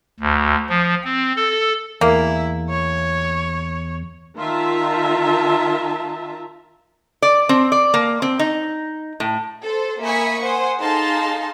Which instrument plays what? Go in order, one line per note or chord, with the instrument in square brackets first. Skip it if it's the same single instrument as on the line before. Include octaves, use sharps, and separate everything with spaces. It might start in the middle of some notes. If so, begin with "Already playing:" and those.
[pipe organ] D2
F3
C4
A4
[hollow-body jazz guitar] E2 [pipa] A#3 [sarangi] E4
[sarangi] C#5
[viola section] D#3 F4 E5 A5 A#5
[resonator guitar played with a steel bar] D5
C4
D5
A#3
C4
D#4
A2
[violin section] A4 C5
A#3 E5 G#5 B5 C#6 D#6
C5 F#5 G#5 D#6
D#4 G#4 A4 F5 A5 C6